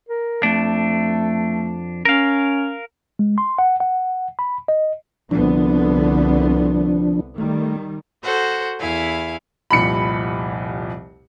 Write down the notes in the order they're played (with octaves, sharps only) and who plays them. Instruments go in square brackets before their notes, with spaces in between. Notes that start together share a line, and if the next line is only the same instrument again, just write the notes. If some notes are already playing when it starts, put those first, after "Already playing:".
[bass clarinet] A#4
[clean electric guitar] F2 D4 [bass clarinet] A3
[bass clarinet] C#4 [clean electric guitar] A#4 F5
[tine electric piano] G#3
C6
F#5
F#5
B5
D#5
[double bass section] C2 D3 B3 [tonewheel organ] F3 D4
[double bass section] D#3 G3 [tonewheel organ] A3
[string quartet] F#4 A4 C5 F#5
E2 E4 F5 G#5
[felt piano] F1 C2 A#2 [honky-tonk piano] B5 C#7